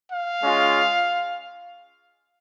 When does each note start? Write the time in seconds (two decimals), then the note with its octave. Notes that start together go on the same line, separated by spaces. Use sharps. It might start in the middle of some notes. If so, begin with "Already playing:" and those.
0.11 F5
0.41 G#3 C#4 F4